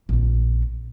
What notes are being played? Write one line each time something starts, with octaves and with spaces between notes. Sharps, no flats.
A#1 C4